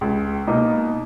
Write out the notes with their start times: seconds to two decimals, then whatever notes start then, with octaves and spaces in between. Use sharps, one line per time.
0.01 C#2
0.47 B2 A#3 D#4